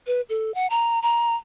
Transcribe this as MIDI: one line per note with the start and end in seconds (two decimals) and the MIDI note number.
0.07 0.21 71
0.29 0.54 69
0.55 0.67 78
0.70 0.99 82
1.02 1.35 82